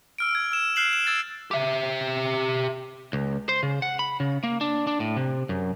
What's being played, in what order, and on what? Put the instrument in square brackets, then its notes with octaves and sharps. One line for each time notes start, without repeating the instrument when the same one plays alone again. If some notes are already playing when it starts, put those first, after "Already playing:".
[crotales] E6 F6 D7
G#6
E6 E7
F6 F#6 C7 E7 F#7
E7
E6 G#6 A6
[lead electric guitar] G4 E5
C#2
C5
C#3
F#5
B5
C#3
A#3
D4
D4
A2
C3
F#2